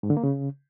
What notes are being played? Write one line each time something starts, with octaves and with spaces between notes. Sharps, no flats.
G#2
D3
A#3
C#3